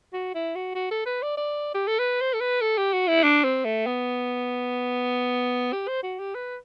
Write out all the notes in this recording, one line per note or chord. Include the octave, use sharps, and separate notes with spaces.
F#4
E4
F#4
F#4
A4
B4
D5
D5
G4
A4
B4
C5
A4
B4
A4
G4
F#4
E4
D4
C4
A3
B3
G4
C5
F#4
G4
B4